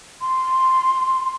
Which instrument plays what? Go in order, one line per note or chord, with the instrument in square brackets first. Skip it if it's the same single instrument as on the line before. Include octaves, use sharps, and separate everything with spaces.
[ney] C6